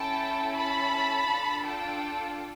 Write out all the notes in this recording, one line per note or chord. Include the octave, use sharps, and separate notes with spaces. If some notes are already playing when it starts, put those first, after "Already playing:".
Already playing: C#4 E4 A4 G5 A5
A5 B5
D4 F4 A4
G5 A5